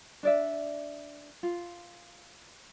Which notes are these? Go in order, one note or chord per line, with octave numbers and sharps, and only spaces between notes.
D4 D5 E5
F4